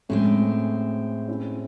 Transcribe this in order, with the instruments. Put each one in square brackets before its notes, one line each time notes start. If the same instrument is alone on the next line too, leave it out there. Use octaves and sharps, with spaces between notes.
[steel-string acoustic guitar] A2 G#3 C4 [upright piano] A3 C#4
[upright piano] C#4 E4